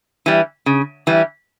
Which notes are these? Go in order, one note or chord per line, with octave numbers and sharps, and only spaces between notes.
E3 G3
C#3
E3 G3